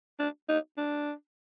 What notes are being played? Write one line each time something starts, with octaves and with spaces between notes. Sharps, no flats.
D4
D#4
D4